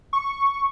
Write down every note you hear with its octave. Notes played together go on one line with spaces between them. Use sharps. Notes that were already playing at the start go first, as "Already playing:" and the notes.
C#6